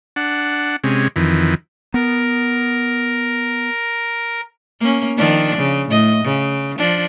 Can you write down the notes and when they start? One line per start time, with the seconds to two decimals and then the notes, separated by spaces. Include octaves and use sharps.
0.16 D4 F#5
0.84 C3 G#3 C#4
1.16 F2 D#3 E3
1.94 B3 A#4
4.80 A#3 C#4
5.17 D#3 F3 D4
5.58 C#3
5.89 A2 D#5
6.24 C#3
6.77 F3 D4